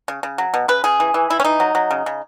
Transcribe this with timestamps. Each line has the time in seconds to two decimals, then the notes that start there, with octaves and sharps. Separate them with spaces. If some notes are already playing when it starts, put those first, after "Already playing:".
0.08 C#3
0.23 C#3
0.38 F#3
0.54 B2
0.68 C#3 B4
0.84 C#3 G#4
1.00 E3
1.14 E3
1.30 E3 E4
1.40 C#4
1.44 E3 D#4
1.60 F#3
1.75 F#3
1.91 C#3
2.06 C#3